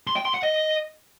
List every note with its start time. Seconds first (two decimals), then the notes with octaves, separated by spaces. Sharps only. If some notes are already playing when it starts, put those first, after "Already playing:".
0.07 C6
0.16 G5
0.25 C6
0.34 F#5
0.43 D#5